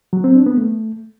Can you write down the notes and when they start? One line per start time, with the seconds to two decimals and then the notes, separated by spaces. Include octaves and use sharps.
0.13 F#3
0.24 C4
0.35 D4
0.46 B3
0.58 A3